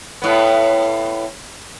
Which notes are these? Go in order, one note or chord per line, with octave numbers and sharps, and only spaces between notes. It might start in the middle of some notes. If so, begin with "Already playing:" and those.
A2 B3